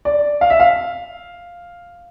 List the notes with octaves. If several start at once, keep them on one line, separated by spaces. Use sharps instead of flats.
D5
F5
E5
F5